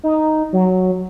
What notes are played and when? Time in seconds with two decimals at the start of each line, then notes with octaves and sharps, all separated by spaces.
0.03 D#4
0.53 F#3